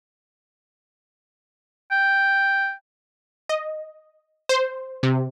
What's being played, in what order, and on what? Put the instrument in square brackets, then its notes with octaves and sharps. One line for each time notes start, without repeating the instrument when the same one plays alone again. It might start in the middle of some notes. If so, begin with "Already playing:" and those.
[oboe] G5
[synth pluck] D#5
C5
C3